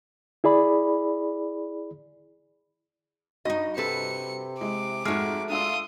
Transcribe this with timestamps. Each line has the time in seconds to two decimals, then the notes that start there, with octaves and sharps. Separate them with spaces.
0.44 E4 G#4 D5 B5
3.45 G2 D#4 F#4 D#5 A#6
3.77 C3 A4 B4 C5 C#7
4.61 G#3 E4 D6
5.05 F2 G#2 G#3 A3 F#4 F6
5.50 D4 F4 F5 D#6 E6